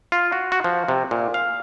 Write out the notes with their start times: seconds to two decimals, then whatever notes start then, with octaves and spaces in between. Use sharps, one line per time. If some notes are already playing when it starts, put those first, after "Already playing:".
0.12 F4
0.32 F#4
0.52 F#4
0.64 F3
0.88 C3
1.11 A#2
1.34 F5